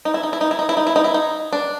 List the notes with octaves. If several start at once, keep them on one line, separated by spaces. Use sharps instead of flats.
D#4
E4
D#4
E4
D#4
E4
D#4
E4
D#4
E4
D#4
E4
D#4
D4